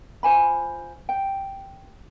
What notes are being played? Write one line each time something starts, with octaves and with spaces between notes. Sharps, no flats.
F4 C5 G#5 B5
G5